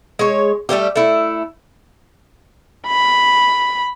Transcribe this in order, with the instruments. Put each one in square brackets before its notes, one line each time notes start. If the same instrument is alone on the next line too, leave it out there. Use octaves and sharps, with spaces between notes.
[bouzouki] G#3 C#5
G3 A3 A#3 G4
A3 E4
[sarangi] B5